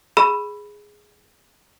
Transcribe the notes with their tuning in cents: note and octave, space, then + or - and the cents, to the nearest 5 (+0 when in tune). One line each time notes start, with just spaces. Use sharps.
G#4 +0 B5 +0 E6 +20